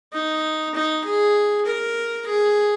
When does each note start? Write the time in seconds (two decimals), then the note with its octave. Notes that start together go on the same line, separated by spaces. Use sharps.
0.13 D#4
0.75 D#4
1.05 G#4
1.66 A#4
2.27 G#4